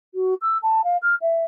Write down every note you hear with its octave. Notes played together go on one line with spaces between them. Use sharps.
F#4
E6
A5
F5
F6
E5